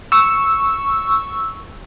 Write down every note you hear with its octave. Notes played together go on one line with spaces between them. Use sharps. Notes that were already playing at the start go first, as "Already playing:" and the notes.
C#6 E6